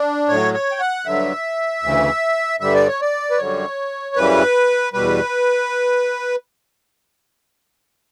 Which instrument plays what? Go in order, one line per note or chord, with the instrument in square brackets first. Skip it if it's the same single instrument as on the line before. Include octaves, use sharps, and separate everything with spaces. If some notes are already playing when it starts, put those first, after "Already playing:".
Already playing: [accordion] D4
A2 F#3 C#5
C#5
G5
F#5
G2 D3 F#3 E5
D2 C#3 E3
G2 D3 G3 E5
D5
C#5
D5
B4
F#2 D3 G3 C#5
F#2 C#3 E3 G3 B4
E2 B2 G3 B4